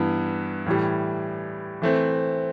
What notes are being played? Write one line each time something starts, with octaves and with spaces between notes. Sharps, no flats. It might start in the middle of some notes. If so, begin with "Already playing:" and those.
Already playing: G2 E3 B3 E4
A2 E3 G3
E3 A3 C4